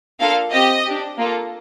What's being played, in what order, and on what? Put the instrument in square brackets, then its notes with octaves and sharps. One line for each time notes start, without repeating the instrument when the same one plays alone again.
[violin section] A#3 D4 F4 A4 F5
C4 G4 D#5
D4 G4
A#3 F4 A4